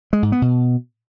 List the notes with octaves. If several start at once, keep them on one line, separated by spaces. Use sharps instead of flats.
G#3
G#2
B3
B2